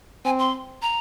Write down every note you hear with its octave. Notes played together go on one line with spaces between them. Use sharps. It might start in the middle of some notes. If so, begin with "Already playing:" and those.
C4 G#5
C6
A#5